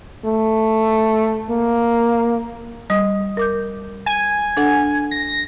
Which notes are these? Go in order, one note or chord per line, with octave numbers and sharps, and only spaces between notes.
A3
A#3
G3 D#5 D#6
A#4 D6 G6
G#5
D4 A4 F#5
A#6